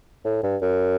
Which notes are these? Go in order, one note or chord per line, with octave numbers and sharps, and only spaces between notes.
A2
G2
F#2